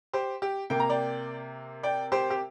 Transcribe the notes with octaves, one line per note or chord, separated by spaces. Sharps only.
G4 C5
G4
C3 A#3 G5
A#5
D5 G5
D5 G5
G4 C5
G4